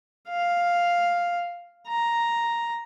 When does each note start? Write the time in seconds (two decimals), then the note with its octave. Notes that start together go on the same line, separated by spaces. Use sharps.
0.29 F5
1.88 A#5